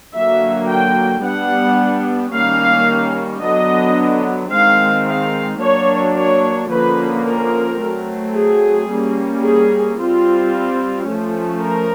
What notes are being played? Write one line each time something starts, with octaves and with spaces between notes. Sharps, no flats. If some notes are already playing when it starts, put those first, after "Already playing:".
D3 F#3 A#3 E5
G5
G3 B3 D4 F#5
D#3 G3 A#3 C#4 F5
D3 F#3 B3 D4 D#5
D#3 G#3 C4 F5
F5
F#3 A#3 D4 C#5
C#5
D3 F3 A#3 C#4 B4
A#4
F#3 A3 C4
G#4
G3 A#3 C#4
G#4
G3 C4 F4
F3 A3 C#4
A#4